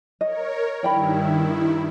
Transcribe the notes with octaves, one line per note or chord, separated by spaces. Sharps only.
A#4 C#5 D#5
G2 D#3 E4 D5 G5 B5